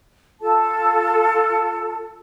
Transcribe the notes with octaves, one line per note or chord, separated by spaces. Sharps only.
F4 A4 A5